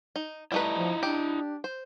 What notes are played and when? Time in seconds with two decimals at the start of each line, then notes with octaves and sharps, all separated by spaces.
0.16 D#4
0.52 G3 A3 E4 B4 D#5 A#5
0.76 F3
1.03 D4 G4
1.64 C5